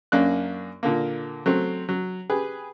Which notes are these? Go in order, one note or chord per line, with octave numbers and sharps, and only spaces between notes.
F#2 A#3 C#4 D4 F#6
A#2 D3 A#3
F#3 A3 C4
F#3
G4 G#4 B4